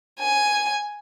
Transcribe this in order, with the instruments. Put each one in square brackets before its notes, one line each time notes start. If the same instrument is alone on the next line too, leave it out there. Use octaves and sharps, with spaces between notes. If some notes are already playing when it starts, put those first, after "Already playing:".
[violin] G#5